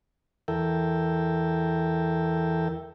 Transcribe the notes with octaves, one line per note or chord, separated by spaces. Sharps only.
E2 A4 A#4 E5 G5